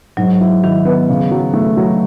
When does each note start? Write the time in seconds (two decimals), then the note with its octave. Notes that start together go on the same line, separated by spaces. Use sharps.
0.17 G#2 F#3
0.41 E4
0.64 D#3 E4
0.85 B3
1.09 C#3
1.31 F#3
1.54 A3
1.77 F#3